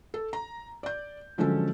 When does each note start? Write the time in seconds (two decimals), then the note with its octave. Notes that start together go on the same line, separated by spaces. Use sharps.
0.14 A4
0.33 A#5
0.83 D5 G6
1.38 D3 F3 F#3 G#3 C#4 A4